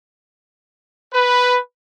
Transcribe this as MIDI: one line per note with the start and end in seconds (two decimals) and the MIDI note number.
1.12 1.55 71